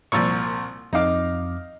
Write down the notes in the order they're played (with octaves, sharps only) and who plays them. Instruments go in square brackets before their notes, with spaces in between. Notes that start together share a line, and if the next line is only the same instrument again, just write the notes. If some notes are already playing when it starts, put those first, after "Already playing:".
[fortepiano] C2 A#2 F3 [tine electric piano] C#6 E6 A6
[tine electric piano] F2 D6 [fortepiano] D#4 F5